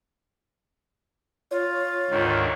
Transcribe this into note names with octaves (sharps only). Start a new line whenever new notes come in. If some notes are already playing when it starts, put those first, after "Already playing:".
F4 C#5
D2 G#2 D#3